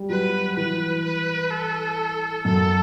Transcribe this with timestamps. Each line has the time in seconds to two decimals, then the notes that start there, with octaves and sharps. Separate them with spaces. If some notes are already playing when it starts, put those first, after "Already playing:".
Already playing: G3
0.10 F#3 B4
0.57 E3 B4
1.04 B4
1.51 A4
2.44 F#2 A4